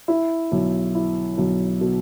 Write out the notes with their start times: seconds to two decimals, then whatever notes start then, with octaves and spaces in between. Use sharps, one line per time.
0.08 E4
0.52 B1
0.95 E4
1.38 B1
1.81 B2